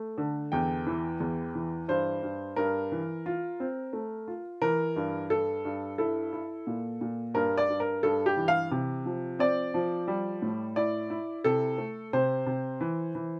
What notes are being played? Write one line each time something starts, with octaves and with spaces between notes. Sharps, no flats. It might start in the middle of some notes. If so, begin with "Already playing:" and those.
Already playing: A3
D3
E2 G5
E3
E2
E3
G2 C5
G2
G2 A#4
E3
F4
C4
A3
F4
E3 A#4
G2
G2 A4
G2
E4 A4
E4
A#2
A#2
G2 A#4
D5
G2
A#4
G2 A4
G4
E3
F5
C3
F3
C4 D5
F3
G3
A2
E4 D5
E4
C3 A4
A3
C3 C5
C3
E3
E3